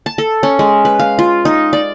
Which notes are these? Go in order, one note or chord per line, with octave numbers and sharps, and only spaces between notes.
A5
A4
C#4
G#3
B4
F5
F4
D#4
D5